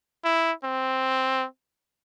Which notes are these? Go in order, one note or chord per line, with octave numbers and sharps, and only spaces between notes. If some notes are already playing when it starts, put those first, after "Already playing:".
E4
C4